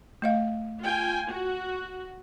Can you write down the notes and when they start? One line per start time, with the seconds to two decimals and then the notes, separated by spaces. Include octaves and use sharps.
0.22 A3 D#5 F5
0.80 F4 G5 G#5
1.29 F#4